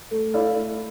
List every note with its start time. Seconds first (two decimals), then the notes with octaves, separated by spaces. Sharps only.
0.11 A3
0.34 E4 A4 D5 F5
0.56 A3